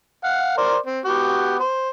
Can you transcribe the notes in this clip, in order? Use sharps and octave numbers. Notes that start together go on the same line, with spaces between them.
F5 F#5
A#4 C5 D5
C4
B3 F#4 G4
C5